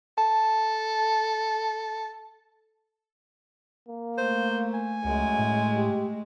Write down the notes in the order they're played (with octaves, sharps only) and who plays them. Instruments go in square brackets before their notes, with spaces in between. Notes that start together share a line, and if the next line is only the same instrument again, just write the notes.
[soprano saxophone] A4 [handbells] A5
[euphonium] A#3
[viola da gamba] A3 [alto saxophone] C5
[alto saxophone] G#5
[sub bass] C#2 [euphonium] F#2 [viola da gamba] G#3 A3
[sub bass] A2
[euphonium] G4